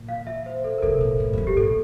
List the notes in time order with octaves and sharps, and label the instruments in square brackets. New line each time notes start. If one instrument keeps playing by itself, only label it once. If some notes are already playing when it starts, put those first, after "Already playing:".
Already playing: [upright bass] A#2
[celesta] F5
E5
C5
A4
A#4
[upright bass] C3 [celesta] A4
[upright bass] A#2
A2
F2
G2
[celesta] G4
[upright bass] A#2 [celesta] A4